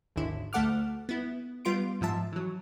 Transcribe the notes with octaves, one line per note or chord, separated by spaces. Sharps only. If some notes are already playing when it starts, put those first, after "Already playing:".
G#1 D#2 D3 E4
D2 A3 A4 F#5 D6 F6
B3 E4
G3 B3 F4 C6 D7
G#2 F3 E5 A5
E3 F#3